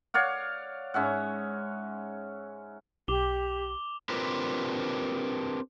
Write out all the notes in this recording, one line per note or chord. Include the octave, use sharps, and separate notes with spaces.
C#5 D5 F5 F#5
G#2 C#4 E5 F#5
B1 G4 D6 F7 G7
C4 D4 F4 G4 A#4 B4